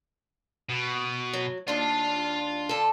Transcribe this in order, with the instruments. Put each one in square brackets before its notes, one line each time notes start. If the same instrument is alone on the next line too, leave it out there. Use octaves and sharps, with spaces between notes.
[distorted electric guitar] B2
[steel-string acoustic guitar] F#3
[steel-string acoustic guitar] D#2 D4 [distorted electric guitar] F5 C6
[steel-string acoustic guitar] D3 A4